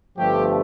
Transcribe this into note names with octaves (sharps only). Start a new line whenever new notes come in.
G1 G2 F3 A3 G4